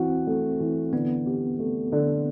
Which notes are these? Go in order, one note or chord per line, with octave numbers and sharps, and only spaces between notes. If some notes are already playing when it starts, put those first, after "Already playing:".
Already playing: E3 C4 F#4
A3
E3
D3 B3
G4
A3
D3